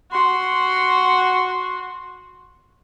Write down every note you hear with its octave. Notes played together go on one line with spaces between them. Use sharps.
F#4 C6